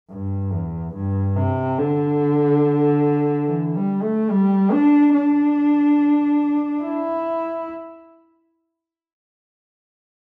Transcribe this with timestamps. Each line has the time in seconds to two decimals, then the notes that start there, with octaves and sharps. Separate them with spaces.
0.11 G2
0.53 E2
0.94 G2
1.36 C3
1.78 D3
3.47 E3
3.75 G3
4.03 A3
4.30 G3
4.72 D4
5.14 D4
6.82 E4